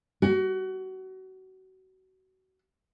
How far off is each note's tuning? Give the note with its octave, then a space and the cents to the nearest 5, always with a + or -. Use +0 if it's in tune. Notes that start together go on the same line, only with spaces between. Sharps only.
F#4 +25